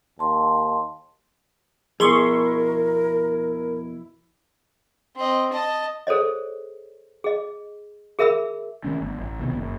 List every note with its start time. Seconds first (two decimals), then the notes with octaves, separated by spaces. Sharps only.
0.19 D#2 A5 C6
2.00 F2 B2 E4 G#4 A#4 C6 C#6
5.16 C4 D#5
5.53 D#5 A5
6.07 G#4 A4 C5 C#5 D#5
7.24 G#4 D#5
8.19 G#4 A#4 E5 B5 E6
8.84 D#3 A3 C#4
9.01 G1
9.18 A1
9.39 C2 B2 D3 D#3
9.55 F#1